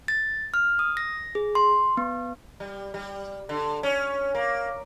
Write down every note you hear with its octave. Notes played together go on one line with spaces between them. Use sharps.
A6
F6
D#6
A#6
G#4
C6
B3
G3
G3
D3
C#4
A#3